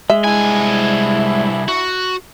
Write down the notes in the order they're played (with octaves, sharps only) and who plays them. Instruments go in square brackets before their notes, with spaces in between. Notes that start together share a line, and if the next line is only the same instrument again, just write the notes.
[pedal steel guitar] G#3 [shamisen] E5
[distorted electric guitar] C2 G#5 [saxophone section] B3 D4 E4
[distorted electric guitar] F#4